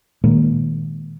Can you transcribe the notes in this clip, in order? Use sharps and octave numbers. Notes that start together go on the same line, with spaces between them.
A#2 D#3 G#3 A#3